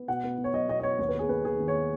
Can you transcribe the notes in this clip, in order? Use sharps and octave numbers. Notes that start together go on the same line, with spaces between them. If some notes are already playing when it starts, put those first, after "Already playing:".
Already playing: B3
B2 F#5
B3
B2
C#5
F#3 D#5
B2 D#5
D#5
B3 C#5
D#2 C#5
B4
B3 G#4
D#2 B4
D#3 G#4
D#2
C#5
B3